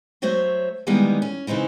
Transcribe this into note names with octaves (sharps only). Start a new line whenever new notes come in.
F#3 A3 F#4 C5 C#5 E5
D#3 E3 G3 G#3 A#3 B3
C#4
C#3 E3 C4 D#4 E4